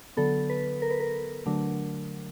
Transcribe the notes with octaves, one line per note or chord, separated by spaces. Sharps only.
D3 F#3 B3 A4
B4
A#4
B4
A#4
D3 F#3 A3 D4